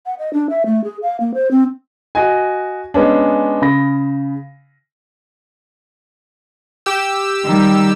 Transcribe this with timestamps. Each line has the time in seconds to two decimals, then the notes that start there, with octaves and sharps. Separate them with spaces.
0.06 F#5
0.19 D#5
0.33 D4
0.49 E5
0.66 A3
0.84 G#4
1.02 F5
1.20 A#3
1.34 C5
1.51 C4
2.15 F#4 D#5 G#5
2.94 G#3 B3 C#4 D4
3.62 C#3 B5 A#6
6.86 G4 E6
7.45 D#3 G3